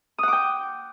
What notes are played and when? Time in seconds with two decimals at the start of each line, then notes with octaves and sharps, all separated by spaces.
0.18 D#6
0.23 F#5
0.28 D6
0.33 G5